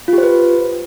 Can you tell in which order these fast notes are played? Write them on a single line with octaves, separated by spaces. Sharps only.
F4 G4 C5 B4